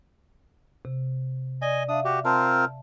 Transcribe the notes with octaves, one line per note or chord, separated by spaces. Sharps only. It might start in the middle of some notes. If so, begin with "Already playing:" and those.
C3
D5 D#5 G#5
D4 E5 F5 D#6
F#4 G4
C4 F4 A#4 A5